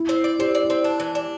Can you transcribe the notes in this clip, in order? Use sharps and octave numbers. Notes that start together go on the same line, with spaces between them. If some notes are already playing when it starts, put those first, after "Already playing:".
Already playing: E4
C4
D5
C4 G4
D5
E4
C4
D4
E3
D4